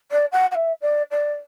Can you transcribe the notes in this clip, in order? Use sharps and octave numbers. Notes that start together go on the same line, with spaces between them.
D5
F#5
F#5
E5
D5
D5